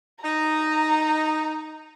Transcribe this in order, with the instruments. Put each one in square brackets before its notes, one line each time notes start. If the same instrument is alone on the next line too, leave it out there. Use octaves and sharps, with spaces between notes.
[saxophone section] D#4 [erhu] A#5